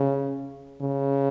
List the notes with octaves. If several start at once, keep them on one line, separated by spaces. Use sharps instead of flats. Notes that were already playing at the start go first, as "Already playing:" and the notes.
Already playing: C#3
C#3